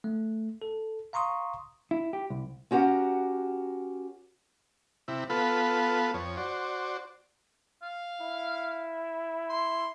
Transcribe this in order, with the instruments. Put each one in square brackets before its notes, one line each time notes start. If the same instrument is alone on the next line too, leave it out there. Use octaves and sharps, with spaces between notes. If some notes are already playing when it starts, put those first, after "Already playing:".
[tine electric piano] A3
A4
F5 A#5 C6 C#6 D#6
[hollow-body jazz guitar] E4
G4
C2
[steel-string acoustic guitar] C#4 F#4 G4 A#4 F#5
[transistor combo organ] C3 E4
B3 F4 A4 B4
F2 C#5
F#4 C5 D5
[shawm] F5
[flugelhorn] E4
[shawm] C6